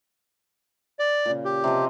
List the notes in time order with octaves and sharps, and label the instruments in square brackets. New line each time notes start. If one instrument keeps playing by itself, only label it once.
[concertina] D5
[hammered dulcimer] A#2 C#3
[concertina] G4
[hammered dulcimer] C3 F3 D#5